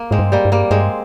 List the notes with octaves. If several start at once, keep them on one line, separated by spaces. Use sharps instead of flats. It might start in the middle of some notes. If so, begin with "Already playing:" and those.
Already playing: A#3
G#2 G#3 C4
G2
G3 A#3
G2
G3 A#3
G2 G#3 C4